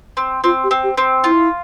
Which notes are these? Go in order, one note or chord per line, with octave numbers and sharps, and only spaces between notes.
C4
C4 F4
G4
C4
G4
C4
E4 F4